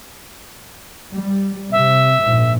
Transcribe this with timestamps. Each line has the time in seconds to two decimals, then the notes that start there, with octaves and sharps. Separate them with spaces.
1.12 G3
1.72 C3 E5
2.22 A#1 G#2